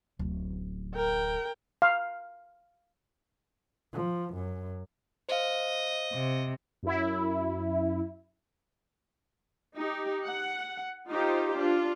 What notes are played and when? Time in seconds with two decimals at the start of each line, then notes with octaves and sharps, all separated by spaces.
0.19 D1 A1
0.96 A#4 G5
1.82 F5
3.93 F3
4.34 F#2
5.29 C5 D#5 F5
6.13 C3
6.83 F#2 E4
9.77 D#4 G4
10.24 F#5
11.10 D#4 F4 G4 C5
11.57 D4 F4